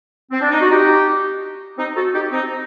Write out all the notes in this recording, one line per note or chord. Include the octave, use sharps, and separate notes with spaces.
C4
D4
D#4
F#4
D#4 G4
C4 D#4
F#4 A4
D#4 G4
C4 D#4